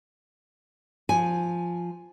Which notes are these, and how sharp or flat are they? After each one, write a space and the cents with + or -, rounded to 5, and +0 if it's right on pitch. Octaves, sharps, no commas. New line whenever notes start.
F3 +0 G#5 +0